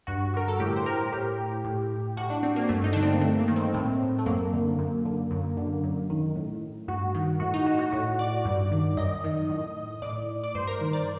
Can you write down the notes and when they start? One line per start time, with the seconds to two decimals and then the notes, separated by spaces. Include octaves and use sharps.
0.07 G2 F#4
0.34 D3 A#4
0.48 A4
0.59 A2 G4
0.76 C5
0.86 A#4
1.13 A2 G4
1.64 A2
2.17 A2 F#4
2.30 D4
2.43 C4
2.56 A#3
2.69 G2 A3
2.84 D#4
2.93 D3 D4
3.03 C4
3.12 A#3
3.21 G2 A3
3.40 A#3
3.48 D#3
3.56 C4
3.74 A2 C4
4.19 A3
4.26 F#2 A#3
4.53 D3
4.79 F#2
5.05 D3
5.31 F#2
5.57 D3
5.83 F#2
6.10 D#3
6.36 A2
6.88 G2 F#4
7.14 D#3
7.40 A2 F#4
7.54 D#4
7.67 F#4
7.79 F#4
7.93 A2 F#4
8.19 D5
8.45 G2
8.72 D#3
8.97 F#2 D#5
9.24 D#3
9.49 A2
10.02 A2 D5
10.44 D5
10.55 G2 C5
10.67 A#4
10.81 D#3
10.93 D5